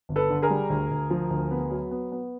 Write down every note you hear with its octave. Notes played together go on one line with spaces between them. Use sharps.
G1
A4 B4
D3
G#4 A#4
G3
D2
D2
F3
D2
B3
F#3
B3
B3